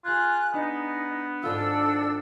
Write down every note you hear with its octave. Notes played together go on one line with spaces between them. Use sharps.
F4 G#4 A#5 F#6 G#6
B3 D4 D#4
G#1 D4 F4 A4 E6